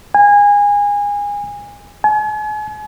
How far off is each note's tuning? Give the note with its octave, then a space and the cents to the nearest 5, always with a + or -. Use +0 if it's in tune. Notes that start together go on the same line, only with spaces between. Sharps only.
G#5 -25
G#5 +40